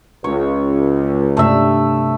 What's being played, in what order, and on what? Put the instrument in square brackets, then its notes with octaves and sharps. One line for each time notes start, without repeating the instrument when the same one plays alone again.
[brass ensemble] C#2 [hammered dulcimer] C#5
[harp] G2 C3 [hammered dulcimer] A3 E5